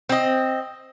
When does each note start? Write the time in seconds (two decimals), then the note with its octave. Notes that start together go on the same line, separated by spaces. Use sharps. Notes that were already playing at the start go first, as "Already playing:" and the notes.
0.09 C4 D#5